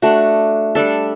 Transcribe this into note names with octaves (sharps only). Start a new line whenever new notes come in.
A3 D4 F#4
G3 D4 A4